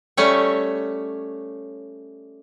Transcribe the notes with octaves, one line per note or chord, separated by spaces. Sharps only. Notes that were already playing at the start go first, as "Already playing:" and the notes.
G3 A3 C#4 C#5